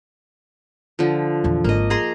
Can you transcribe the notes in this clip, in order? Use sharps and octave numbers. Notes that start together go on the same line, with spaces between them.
D3 F3
A#1 E2
G#1 A#3 D#5
G#4 A#5 C6